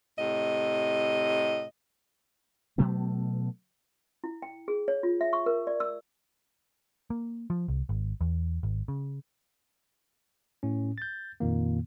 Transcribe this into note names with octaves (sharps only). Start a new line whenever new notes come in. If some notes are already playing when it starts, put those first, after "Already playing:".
A2 C3 D#5
B2 F#3 A3 B3
E4
G5
G#4
C#5
F4
E5
C#6
A#4
D5
E6
A#3
F3
C2
G#1
E2
G#1
C#3
A2 C#4
G6 A6
F2 A#2 D#3 A#3